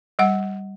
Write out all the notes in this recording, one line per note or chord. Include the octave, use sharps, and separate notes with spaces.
G3 F#5